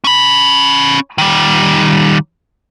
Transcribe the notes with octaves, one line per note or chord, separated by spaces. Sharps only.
C#4 B5
D#3 G3